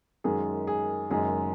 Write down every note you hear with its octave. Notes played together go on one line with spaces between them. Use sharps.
F#2 D#3 G#3 G#4
G#4
F#1 F#2 D#3 G#3 G#4